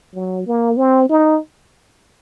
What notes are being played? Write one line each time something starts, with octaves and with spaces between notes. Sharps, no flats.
F#3
A#3
C4
D#4